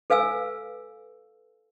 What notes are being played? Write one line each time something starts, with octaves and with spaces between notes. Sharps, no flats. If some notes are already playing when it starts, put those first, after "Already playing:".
A4 B4 F5 G#5 E6